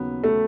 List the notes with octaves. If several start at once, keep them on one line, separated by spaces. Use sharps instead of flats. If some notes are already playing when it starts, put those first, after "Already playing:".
Already playing: D#2 C#3 F#3 B3
A3 A4